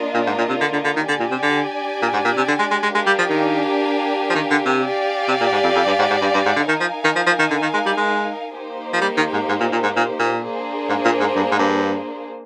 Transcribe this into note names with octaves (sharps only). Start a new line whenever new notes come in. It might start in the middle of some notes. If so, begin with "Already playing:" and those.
Already playing: A#3 D4 F4 A#4 D#5
A#2
G#2
A#2
C3
D3
D3
D3
D#3
D3 D4 G4 D5 G#5
A#2
C3
D3
A#2
G#2
A#2
C3
D3
G#3
G#3
G#3
G#3 D4 G4 A#4 F5 G#5
G3
F3
D#3
F3
D#3
D3
C3
G4 D5 F5 G#5
C3
A#2
G#2
F2
F2
G2
G#2
G#2
G2
G2
G#2
D3
D#3 D#4 A#4 F5 G#5
F3
D#3
F3
F3
D#3
D3
D#3
G#3
G3
G#3
A#3 D#4 G4 C5
F3
G3
D#3
G#2
G#2
A#2
A#2
G#2
A#2
A#2
A#3 D4 G#4 C5
G#2
A#2
G#2
G2
G#2
G2